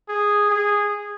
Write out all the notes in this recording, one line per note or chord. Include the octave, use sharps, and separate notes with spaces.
G#4
G#4